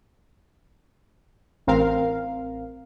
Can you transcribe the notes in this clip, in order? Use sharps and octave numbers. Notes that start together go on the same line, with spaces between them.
A1 C4 A#4 F5